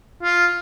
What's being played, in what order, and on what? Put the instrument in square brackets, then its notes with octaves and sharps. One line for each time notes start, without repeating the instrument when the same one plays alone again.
[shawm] F4